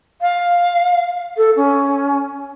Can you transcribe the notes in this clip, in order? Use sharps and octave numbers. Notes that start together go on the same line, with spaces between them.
F5
A4
C#4